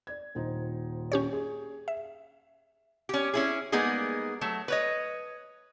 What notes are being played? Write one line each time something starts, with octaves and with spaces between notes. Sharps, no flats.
D5 G#6
D#1 D#4 C5
C#4 G4 C#5
G#4
E5
C#4 G4
C#4 E4 G#4
G3 G#3 A#3 B3 D#4 G#4
F#3 A3
B4 C#5 D#5